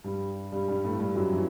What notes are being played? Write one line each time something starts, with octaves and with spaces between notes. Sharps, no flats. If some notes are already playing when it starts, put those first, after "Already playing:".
G2 G3
G2 G3
G2 G3
A2 A3
G2 G3
F#2 F#3
E3